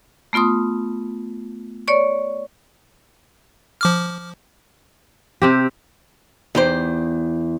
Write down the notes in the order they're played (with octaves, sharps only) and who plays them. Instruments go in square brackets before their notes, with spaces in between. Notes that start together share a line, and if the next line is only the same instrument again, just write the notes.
[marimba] A3 B3 F4 C6 D#6
C#5 D5 C#6
[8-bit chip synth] F3 D6 F6
[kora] C3 C4 G4
[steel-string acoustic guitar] E2 [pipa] D#4 G4 C5